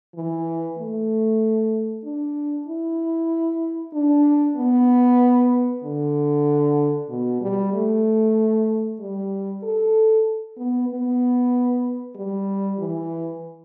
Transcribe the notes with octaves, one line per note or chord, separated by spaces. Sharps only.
E3
A3
D4
E4
D4
B3
D3
B2
G3
A3
G3
A4
B3
B3
G3
E3